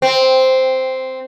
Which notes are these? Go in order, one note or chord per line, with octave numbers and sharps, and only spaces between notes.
C4